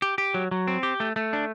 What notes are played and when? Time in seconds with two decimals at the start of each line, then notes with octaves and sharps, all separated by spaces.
0.02 G4
0.18 G4
0.34 F#3
0.51 F#3
0.68 C4
0.83 G4
1.00 A3
1.16 A3
1.33 D4